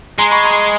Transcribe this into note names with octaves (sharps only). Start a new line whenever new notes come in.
G#3 A#5 C6
B5 C#6
A#5 C6